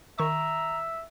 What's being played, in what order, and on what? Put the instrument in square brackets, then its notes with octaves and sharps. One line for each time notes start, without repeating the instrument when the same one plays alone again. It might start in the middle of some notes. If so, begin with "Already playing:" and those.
[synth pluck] D#3 C#6 [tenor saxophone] E5 [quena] A#5